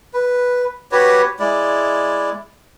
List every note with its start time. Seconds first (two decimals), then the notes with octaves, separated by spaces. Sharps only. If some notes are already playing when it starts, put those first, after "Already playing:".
0.14 B4
0.92 F#4 G4 B4 C#5
1.40 G#3 E4 D5